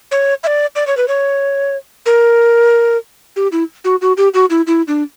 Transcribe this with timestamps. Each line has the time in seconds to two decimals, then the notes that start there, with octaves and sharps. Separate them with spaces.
0.11 C#5
0.43 E5
0.47 D5
0.76 D5
0.87 C#5
0.97 B4
1.08 C#5
2.06 A#4
3.36 G4
3.52 E4
3.84 F#4
4.01 F#4
4.17 G4
4.34 F#4
4.50 E4
4.67 E4
4.88 D4